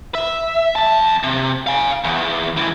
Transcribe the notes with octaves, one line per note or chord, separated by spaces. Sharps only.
E5
F2 A5
C3
F5 G#5
E2
C#2 E3